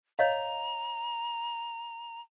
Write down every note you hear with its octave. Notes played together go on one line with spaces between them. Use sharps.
C#5 D#5 F5 A#5